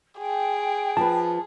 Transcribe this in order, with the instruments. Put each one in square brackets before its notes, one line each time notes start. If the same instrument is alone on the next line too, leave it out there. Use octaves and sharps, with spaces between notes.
[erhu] G#4 [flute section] G5
[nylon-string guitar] F3 B4 [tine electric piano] A5